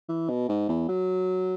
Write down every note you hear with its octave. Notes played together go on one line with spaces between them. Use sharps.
E3
B2
G#2
E2
F#3